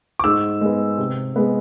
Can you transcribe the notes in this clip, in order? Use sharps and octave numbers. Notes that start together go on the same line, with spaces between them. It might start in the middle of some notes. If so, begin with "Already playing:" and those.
D6
G#2 E6
G#3 B3
C3
G#3 B3